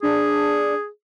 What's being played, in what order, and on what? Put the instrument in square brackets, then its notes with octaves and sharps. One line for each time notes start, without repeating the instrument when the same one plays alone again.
[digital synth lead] D4 [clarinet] G#4